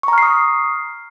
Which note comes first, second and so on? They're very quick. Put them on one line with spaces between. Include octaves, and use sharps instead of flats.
C#6 A#5 F6 C7 D#6